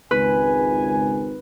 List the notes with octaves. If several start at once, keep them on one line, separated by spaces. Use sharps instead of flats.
G#1 C#2 B4 G#5